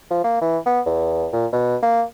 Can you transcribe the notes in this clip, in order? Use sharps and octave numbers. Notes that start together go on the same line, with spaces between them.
F3
A#3
E3
B3
E2
A#2
B2
A#3